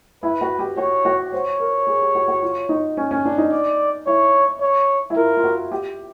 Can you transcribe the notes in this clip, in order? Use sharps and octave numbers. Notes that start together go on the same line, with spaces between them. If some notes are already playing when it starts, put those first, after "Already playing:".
E4 B4
F#4
G4
F#4 C#5
F#4
C5 C#5
A#4
G#4
G4
F#4
F#4
F4
D#4
C#4
C#4
D4
D#4
D5
E4 C#5
C#5
E4
F4 A#4
F4
F#4
G4